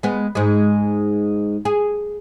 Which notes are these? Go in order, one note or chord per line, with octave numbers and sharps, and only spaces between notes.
G#3 B3
G#2 G#3
G#4